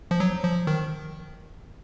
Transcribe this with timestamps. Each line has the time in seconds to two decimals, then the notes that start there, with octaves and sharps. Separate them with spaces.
0.11 F3
0.20 F#3
0.43 F3
0.67 D#3